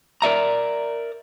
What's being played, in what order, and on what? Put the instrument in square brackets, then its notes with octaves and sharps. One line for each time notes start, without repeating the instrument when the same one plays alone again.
[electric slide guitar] A#4 D5 E5 A#5